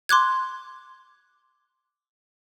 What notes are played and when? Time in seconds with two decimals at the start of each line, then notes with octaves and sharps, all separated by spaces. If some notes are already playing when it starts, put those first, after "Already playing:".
0.09 C6 D6 F#6 G#6